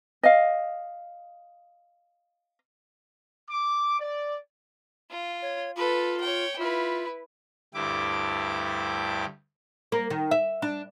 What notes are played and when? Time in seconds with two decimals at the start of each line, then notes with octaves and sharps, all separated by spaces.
0.23 D#5 F5
3.49 D6
3.99 D5
5.10 F4
5.42 C#5
5.76 F4 A4 B4
6.20 C#5 G5
6.59 E4 F4 B4
7.74 D2 G2 E4 G4 D6
9.92 A#3
10.10 D#3
10.31 E5
10.62 D4